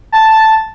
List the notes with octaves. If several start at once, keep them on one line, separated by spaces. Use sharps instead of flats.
A5